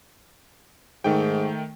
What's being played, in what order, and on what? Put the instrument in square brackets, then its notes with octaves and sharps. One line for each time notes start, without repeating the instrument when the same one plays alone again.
[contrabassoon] G#2 [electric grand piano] D#3 A3 G5